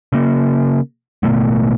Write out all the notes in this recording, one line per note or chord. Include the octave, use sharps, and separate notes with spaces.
C#3 A#3
A1 B2 A3 B3